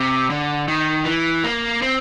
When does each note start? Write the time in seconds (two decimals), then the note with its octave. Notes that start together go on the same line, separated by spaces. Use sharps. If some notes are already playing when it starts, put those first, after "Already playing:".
Already playing: C3
0.30 D3
0.68 D#3
1.05 E3
1.44 A#3
1.82 C4